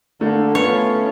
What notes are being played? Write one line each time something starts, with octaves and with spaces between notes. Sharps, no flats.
D3 A3 A#3
A3 B3 C#4 F4 C#5